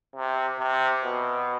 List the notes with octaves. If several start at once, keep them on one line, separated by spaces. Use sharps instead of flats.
C3
C3
B2